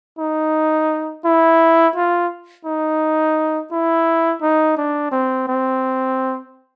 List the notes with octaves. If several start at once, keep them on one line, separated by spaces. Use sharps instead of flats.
D#4
E4
F4
D#4
E4
D#4
D4
C4
C4